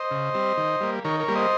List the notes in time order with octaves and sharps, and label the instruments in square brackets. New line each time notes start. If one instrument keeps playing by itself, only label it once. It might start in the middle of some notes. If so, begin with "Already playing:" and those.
Already playing: [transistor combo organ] C5 D#5
C#3
G3 C4
D#3
G3 A#3
D#3 A#4 C#5
A#4 C#5
G3 A#3
C5 D#5